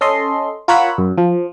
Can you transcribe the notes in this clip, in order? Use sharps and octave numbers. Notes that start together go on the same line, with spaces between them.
C#4 A4 D#5 C6
F4 A#4 C#5 F#5 B5 E6
F#2
F3